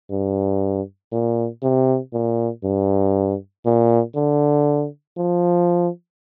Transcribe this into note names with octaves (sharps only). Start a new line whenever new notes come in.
G2
A#2
C3
A#2
G2
A#2
D3
F3